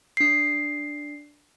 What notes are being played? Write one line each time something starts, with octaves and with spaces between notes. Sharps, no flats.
D4 C7